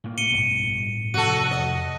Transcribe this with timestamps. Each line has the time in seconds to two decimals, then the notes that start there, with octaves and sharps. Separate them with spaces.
0.04 A2 A#3
0.18 C#7 D#7 G7
0.31 A#1 G2 B2
0.63 A2
1.14 F1 E2 F#4 A4 D#7
1.51 F2 D#5